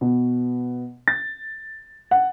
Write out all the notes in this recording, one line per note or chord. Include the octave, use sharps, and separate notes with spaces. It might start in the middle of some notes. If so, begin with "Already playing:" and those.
B2
A6
F#5